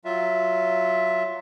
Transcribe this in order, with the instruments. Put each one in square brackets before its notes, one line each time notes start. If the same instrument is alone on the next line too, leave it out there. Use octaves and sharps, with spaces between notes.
[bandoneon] F#3 F4 E5